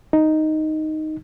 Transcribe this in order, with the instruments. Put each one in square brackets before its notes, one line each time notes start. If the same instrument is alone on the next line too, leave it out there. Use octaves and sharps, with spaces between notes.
[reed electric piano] D#4